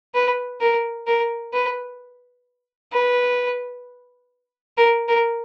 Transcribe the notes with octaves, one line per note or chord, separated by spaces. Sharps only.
B4
A#4
A#4
B4
B4
A#4
A#4